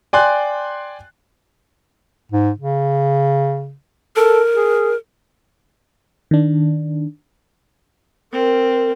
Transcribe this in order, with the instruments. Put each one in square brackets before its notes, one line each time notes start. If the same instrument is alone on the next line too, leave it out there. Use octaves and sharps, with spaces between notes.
[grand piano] D5 G5 G#5 C6 F#6
[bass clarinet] G#2
C#3
[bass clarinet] A4 [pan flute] A#4
[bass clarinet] G#4
[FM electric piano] D#3 D4
[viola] C4 [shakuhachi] A#4